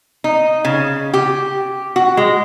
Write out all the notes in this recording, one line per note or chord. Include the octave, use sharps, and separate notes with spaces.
D#4
C#3
G4
F#4
G#3